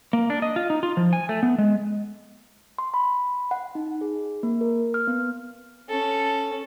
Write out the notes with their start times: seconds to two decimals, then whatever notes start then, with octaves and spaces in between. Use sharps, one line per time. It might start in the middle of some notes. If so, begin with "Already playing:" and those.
0.13 A#3
0.30 D4
0.42 D#5
0.56 F4
0.70 D#4
0.83 F4
0.97 F3
1.13 G#5
1.29 A3
1.43 B3
1.58 G#3
2.78 C6
2.94 B5
3.51 F#5
3.75 D#4
4.01 G#4
4.43 A#3
4.61 A#4
4.94 F6
5.07 B3
5.89 C#4 A4